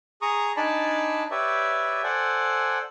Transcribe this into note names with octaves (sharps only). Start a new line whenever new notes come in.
G#4 A#5 C#6 D#6
D4 D#4 D5 G#5 A5 B5
G4 B4 C#5 D5 E5
A4 C5 D5 F#5 G#5